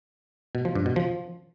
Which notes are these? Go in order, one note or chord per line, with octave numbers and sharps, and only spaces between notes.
B2
F3
G2
B2
F3